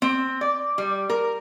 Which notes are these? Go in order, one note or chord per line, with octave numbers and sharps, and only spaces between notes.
C4
D5
G3
A#4